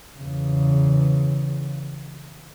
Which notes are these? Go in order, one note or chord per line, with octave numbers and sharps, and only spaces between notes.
E2 C#3